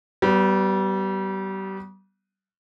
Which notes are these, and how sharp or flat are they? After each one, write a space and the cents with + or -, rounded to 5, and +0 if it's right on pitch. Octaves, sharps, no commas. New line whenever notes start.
G3 -30 B3 +0